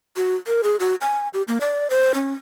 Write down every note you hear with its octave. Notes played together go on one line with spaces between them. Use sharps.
F#4
A#4
G#4
F#4
G#5
G4
A#3
D5
C5
C#4